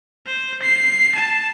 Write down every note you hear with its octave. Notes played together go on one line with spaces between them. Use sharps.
C5
C7
A5